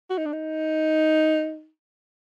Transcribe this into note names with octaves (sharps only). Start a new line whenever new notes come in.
F#4
D#4
D4
D#4